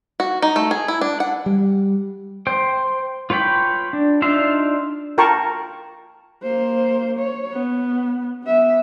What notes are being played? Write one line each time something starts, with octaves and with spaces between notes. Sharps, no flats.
F#4
D#4
A3
G#4
E4
D4
F#5
G3
C5 G5
F4 B4 C#5 G5 B5
D4
D4 D#4 F4 E5 C6
F4 A#4 G5 A5 A#5 C#6
A#3 C5
C#5
B3
B3 E5